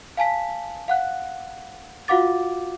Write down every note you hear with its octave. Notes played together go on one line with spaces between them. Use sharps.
F5 G#5 A5 B6
F5 F#5 F#6
F4 F#4 F5 F#5 D6 A6